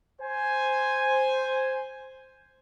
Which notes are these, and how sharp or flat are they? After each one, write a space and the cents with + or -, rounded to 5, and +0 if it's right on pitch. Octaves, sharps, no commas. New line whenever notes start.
C5 +0 G#5 +0